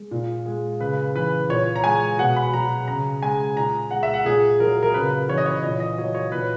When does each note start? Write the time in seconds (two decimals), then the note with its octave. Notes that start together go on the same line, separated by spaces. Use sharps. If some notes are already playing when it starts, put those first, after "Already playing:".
Already playing: G#3
0.11 A#2
0.46 G#3
0.80 C#3 B4
1.15 E3 B4
1.49 A#2 C#5
1.76 A#5
1.83 G#3 G#5
2.18 B2 F#5
2.36 B5
2.53 F#3 A#5
2.87 C#3 A#5
3.22 G#3 G#5
3.56 A#2 A#5
3.91 G#3 F#5
4.03 E5
4.14 F#5
4.25 A#2 G#4
4.60 F#3 A#4
4.83 A#4
4.94 C#3 B4
5.28 E3 C#5
5.38 D#5
5.46 C#5
5.63 A#2 D#5
5.80 D#5
5.98 F#3 C#5
6.15 C#5
6.32 A#2 B4